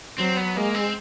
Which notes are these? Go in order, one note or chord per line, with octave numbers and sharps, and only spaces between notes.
F#3 C4
B3
G#3 A#3
C4